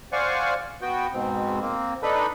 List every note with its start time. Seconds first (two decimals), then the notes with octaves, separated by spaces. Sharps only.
0.13 C5 D5 F5 F#5 G#5 C#6
0.82 B3 F#4 G5
1.13 G#2 B2 C4
1.61 A#3 C4
2.03 D4 D#4 A4 B4 B5